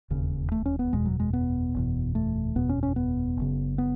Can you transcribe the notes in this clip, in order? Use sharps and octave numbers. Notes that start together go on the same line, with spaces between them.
E1 D#2 C#3
A3
C#4
B3
F#1 E2 B2 G#3
F#3
G#3
B3
F#1 E2 B2
A3
F#1 E2 B2 B3
C#4
C#4
B3
F#1 F#2 C#3
B3